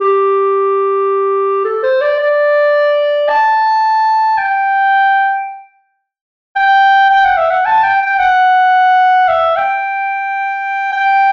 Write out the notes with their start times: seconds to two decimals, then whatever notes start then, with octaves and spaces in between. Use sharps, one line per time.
0.01 G4
1.64 A4
1.83 C5
2.01 D5
2.20 D5
3.29 A5
4.38 G5
6.56 G5
7.10 G5
7.24 F#5
7.37 E5
7.51 F#5
7.65 A5
7.83 G5
8.02 G5
8.19 F#5
9.28 E5
9.56 G5
10.92 G5